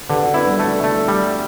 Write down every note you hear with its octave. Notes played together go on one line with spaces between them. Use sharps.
D3 G4 B4
D4 F#4
B3 D4 E4
G3
A3
A3
G3